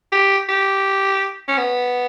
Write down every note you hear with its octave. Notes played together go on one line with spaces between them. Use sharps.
G4
G4
C#4
B3